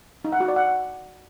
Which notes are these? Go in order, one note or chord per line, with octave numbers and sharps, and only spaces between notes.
D#4
F#5
F#4
D5
F#5